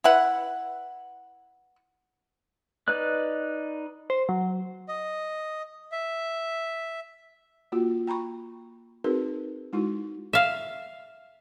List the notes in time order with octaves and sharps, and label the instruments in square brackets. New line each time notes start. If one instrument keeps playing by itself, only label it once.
[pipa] E4 B4 F#5
[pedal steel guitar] D#4 B4 D5 F#6
[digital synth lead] C5
F#3
[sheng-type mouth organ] D#5
E5
[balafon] A#3 F4 F#4
G5 A#5 B5 C#6
C4 D#4 F#4 G#4 A#4 B4
G#3 D#4 E4 F#4
[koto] E5 F5